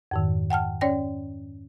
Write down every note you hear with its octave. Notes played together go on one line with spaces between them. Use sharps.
F2 G#2 D#3
F#5 G5 A5 F6
C#4 C#5 D5 G5 A#6